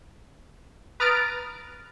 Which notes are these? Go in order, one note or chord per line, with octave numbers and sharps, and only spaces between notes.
B4 A#5 D#6 F6 A6 D7